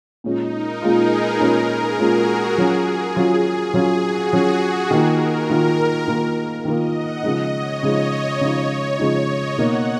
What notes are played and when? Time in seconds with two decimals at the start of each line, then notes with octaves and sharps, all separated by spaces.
0.24 A#2 G#3 C#4 D#4 F4
0.53 A#4
0.82 A#2 G#3 C#4 F4 G#4
1.12 B4
1.40 A#2 G#3 C#4 F4 A#4
1.69 G#4
1.99 A#2 G#3 C#4 F4 F#4
2.28 G#4
2.58 F#3 C#4 F4
3.16 F#3 C#4 F4
3.74 F#3 C#4 F4 G#4
4.03 F#4
4.32 F#3 C#4 F4 G#4
4.61 G#4
4.91 D#3 A#3 F4 A#4
5.50 D#3 A#3 F4
6.08 D#3 A#3 F4
6.65 D#3 A#3 F4 D#5
6.95 F#5
7.23 C#3 F3 G#3 D#4 D#5
7.53 C#5
7.82 C#3 F3 G#3 D#4 D#5
8.11 C#5
8.41 C#3 F3 G#3 D#4 C#5
8.99 C#3 F3 G#3 D#4 C#5
9.28 D#5
9.57 B2 A#3 D#4 F#5